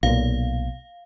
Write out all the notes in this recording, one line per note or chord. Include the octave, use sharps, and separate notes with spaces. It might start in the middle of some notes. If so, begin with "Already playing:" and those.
B1 A#2 F5